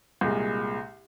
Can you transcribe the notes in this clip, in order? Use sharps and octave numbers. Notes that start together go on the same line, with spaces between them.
C2 A#2 G#3